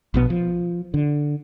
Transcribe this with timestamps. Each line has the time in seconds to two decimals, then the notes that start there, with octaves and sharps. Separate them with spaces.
0.14 A#1 B2 B3
0.30 F3
0.94 D3